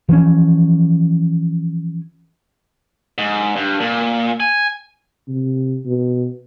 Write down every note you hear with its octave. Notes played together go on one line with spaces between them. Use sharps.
E3 F3 C4 C#4
G#2
G2
A#2
G#5
C3
B2